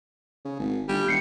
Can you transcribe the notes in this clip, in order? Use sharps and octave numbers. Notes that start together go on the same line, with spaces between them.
C#3
G#1
G1 G3
E1 G6 C7 C#7